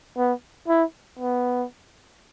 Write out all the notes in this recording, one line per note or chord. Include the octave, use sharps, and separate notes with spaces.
B3
E4
B3